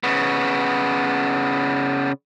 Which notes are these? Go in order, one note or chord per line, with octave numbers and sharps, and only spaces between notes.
C#3 B3